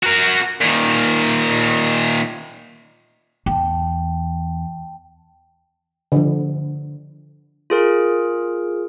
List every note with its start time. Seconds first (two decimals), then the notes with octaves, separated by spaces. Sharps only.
0.03 F#4 A#4
0.61 A#2 D#3
3.46 E2 G5 A5
6.12 D3 F3
7.70 F4 G#4 A#4